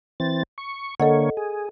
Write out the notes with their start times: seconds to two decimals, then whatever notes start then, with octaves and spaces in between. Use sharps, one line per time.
0.20 E3 C4 A6
0.58 C#6
1.00 D3 A#3 A4 C#5 D#5 F#5
1.37 G#4